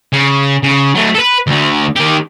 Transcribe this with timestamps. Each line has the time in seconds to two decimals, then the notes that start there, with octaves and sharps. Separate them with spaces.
0.13 C#3
0.63 C#3
0.95 F#3 A3
1.15 A4 B4
1.47 D2 D3
1.96 D#3 G4